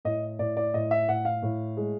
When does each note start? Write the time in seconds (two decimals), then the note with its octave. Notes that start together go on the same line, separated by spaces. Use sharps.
0.05 A2 D#5
0.39 A2 D5
0.57 D5
0.74 A2 D#5
0.91 E5
1.08 A2 F#5
1.25 F5
1.43 A2
1.77 G#3